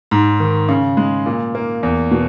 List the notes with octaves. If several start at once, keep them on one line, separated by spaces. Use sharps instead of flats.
G#2
D#3
C#3
G#3
A#2
A#3
E2
B2